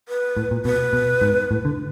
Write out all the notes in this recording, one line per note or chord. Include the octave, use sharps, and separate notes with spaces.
B4
A2
A#2
B2 B4
B2
G#2
A2
D3